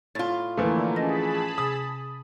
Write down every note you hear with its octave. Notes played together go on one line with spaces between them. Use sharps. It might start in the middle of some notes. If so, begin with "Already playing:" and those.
A2 F4 A6
D3 E3 F3 A3 A#3 E4
C#4 G#4 D#5 A5 B5 A#6
C3 D#6